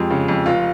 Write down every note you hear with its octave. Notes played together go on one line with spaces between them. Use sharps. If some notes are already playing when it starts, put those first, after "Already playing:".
Already playing: F2 G#3 G4
C#3
F2
F1 F4